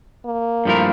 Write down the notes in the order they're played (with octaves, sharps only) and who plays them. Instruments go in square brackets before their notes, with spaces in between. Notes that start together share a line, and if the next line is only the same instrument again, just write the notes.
[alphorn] A#3
[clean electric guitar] G2 F3 A3 E4 A#4